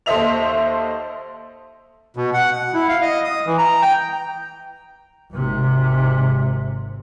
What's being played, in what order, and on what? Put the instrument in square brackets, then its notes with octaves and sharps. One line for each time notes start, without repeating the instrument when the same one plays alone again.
[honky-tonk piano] D#2 A4 C5 D#5 E5 F7
[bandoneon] B2
F#5
F#5
E4
F5
D#5
D#6
E3
A#5
G5
[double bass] G#1 C3